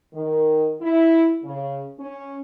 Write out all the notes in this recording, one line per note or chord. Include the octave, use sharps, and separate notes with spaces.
D#3
E4
C#3
C#4